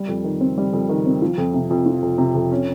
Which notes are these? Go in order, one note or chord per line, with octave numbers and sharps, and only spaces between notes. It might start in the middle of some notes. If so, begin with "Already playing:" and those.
Already playing: G3
F2
D#3
C4
G3
F2
D#3
C4
F3
F2
C3
F2
F3
F2
C3
F2
C#4